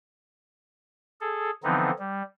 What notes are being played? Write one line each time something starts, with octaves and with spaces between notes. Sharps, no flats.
G#4 A4
D3 E3 F3 B3 C4 D#4
G3